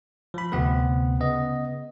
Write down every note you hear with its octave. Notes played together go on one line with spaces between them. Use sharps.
F3 B5
D2 C3 B3 C4 B4
C#3 B3 D#5